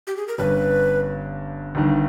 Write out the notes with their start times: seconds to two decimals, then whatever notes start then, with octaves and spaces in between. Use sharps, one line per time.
0.07 G4
0.17 G#4
0.28 A#4
0.38 G1 G2 G3 C#4 B4
1.75 G1 G2 D#3